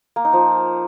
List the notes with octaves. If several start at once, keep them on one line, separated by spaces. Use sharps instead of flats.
A#3
D#4
F3